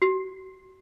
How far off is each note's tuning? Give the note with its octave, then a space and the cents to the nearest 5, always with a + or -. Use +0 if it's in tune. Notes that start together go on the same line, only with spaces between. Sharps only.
F#4 +35